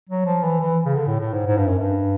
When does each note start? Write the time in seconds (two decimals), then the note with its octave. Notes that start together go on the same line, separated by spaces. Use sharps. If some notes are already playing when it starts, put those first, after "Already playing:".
0.09 F#3
0.26 F3
0.44 E3
0.61 E3
0.85 C#3
0.95 D3
1.07 A2
1.20 A2
1.33 G#2
1.46 G#2
1.57 G2
1.68 F#2
1.79 G2